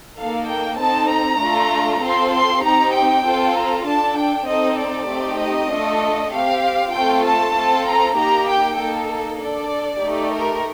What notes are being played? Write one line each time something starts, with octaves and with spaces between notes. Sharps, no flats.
A#3 D#4 A4 F5
G5
C4 D#4 A4 A5
A#5
A3 D4 F4 A4
C4 F4 A4 C6
C6
C4 D#4 G4 A#5
G5
C4 F4 A4
A#5
D4 A4 A5
G5
C4 D#4 A4 D#5
D5
A3 C4 D#4 G4
D#5
A3 D4 F4 A4
C4 G4 F5
A3 C4 F4 A4 G5
A5
C4 F4 A4
A#5
A#3 D#4 G4 A#5
G5
A#3 D#4 A4
D4 A4 D5
A3 D#4 G4
A#4